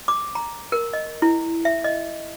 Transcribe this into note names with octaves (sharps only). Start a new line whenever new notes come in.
D6
A#5
A#4
D#5
E4
E5
D#5